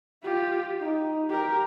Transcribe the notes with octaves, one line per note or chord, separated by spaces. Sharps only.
F4 G4
D#4
G4 A#4